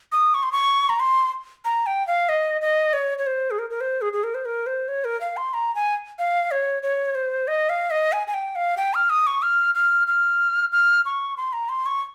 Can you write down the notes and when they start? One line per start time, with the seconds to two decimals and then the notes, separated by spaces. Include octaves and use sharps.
0.12 D#6
0.34 C#6
0.43 C6
0.52 C#6
0.89 A#5
1.00 C6
1.65 A#5
1.86 G5
2.07 F5
2.29 D#5
2.61 D#5
2.93 C#5
3.18 C#5
3.27 C5
3.51 G#4
3.59 A#4
3.70 A#4
3.81 C5
4.01 G#4
4.13 G#4
4.24 A#4
4.35 C5
4.45 A#4
4.66 C5
4.88 C#5
5.05 A#4
5.21 F5
5.37 C6
5.54 A#5
5.75 G#5
6.19 F5
6.51 C#5
6.83 C#5
7.15 C5
7.48 D#5
7.69 F5
7.91 D#5
8.13 G#5
8.27 G#5
8.34 G5
8.56 F5
8.77 G5
8.94 F6
9.10 D#6
9.27 C#6
9.42 F6
9.75 F6
10.07 F6
10.72 F6
11.05 C#6
11.37 C6
11.53 A#5
11.69 C6
11.86 C#6